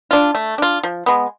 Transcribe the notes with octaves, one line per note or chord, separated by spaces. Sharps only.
D4 F4
A3
D4 F4
F3
G#3 B3